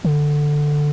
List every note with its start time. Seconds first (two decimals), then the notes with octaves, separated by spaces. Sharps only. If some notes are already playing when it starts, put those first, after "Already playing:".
0.05 D3